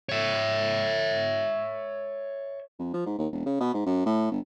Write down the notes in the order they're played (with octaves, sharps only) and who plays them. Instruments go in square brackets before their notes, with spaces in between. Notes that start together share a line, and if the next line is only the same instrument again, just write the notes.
[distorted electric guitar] C#5 E5
[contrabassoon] F2
F3
G#2
D#2
E1
C#3
B2
G#2
F#2
A2
G1